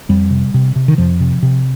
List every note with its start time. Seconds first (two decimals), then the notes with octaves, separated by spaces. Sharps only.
0.09 F2 G3
0.31 C3
0.54 C3
0.76 C3
0.88 D#3
0.98 F2 F3
1.20 C3
1.43 C3